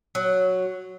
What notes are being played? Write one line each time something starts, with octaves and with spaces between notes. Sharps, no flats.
F#3